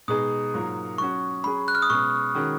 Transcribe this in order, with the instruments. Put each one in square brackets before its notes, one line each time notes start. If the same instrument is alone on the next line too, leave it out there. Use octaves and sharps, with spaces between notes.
[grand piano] B2 G#3 D#4 G#4 [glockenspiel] D#6
[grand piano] G#2 F#3 A#3 F4 A#4
[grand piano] F#3 C#4 F#4 [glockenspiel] C#6
[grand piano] F#3 C#4 G#4 [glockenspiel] B5
[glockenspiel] F#6
F6
D#6
[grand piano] B2 G#3 C#4 G#4 [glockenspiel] C#6
[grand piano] D#3 G#3 C#4 F#4